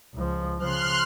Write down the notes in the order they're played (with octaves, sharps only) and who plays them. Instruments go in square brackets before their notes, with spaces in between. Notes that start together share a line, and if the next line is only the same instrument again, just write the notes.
[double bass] C#2 F3
[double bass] C#3 F3 [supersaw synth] C6 F6 F#6